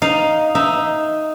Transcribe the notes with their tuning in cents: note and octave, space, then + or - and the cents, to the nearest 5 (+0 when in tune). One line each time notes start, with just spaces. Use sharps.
D#4 +0 F5 +0
D#4 +0 E5 +0